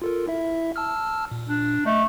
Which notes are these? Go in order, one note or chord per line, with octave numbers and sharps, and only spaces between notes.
F4 A4 A#4
E4 E5
A5 E6 F6
A#2
D4
A3 D#5